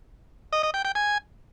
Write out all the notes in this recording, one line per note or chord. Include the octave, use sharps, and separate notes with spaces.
D#5
D#5
G5
G5
G#5